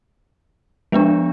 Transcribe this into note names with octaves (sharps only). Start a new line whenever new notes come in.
F3 G#3 B3 D4